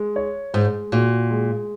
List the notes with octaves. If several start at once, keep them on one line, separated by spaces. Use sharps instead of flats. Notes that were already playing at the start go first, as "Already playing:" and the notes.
Already playing: G#3
C#5
G#2 G#3
A#2 F#4
G#3